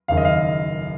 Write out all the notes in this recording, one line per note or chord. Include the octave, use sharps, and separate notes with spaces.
F#1 F#2 D#3 F5
D#5
F5